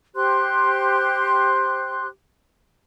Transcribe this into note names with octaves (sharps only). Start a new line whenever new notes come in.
G4 C5 C6 F#6